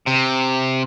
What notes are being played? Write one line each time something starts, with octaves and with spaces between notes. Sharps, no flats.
C3